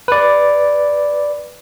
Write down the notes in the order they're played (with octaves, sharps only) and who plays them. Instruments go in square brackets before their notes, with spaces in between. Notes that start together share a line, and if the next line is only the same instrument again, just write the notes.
[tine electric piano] B4 D5